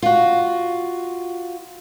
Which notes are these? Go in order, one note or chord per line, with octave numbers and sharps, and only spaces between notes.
F4 F#4